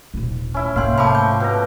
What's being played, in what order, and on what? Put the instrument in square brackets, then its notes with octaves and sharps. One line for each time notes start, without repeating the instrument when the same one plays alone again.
[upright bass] D#1 G#1
[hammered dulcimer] C#4 E4
[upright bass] G#2 C3 [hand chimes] A#3 C6 [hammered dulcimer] F5 G5
[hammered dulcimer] F3 A3 [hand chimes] B5 D6
[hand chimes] G6
[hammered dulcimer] B2 A#5